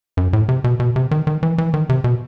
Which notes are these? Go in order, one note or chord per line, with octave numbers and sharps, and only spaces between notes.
F#2
A2
C3
B2
B2
C3
D#3
D#3
E3
E3
D#3
C3
B2